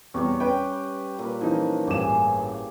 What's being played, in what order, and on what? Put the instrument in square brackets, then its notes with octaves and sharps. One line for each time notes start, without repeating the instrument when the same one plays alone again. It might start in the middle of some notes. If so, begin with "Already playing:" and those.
[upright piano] E2 [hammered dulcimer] G3 G4 C#5
[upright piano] C#4 B4 G5
[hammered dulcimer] A#2 B4
[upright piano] E3 C#4 D#4 [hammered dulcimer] F3
[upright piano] A1 G2 E7 [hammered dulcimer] G4 G#4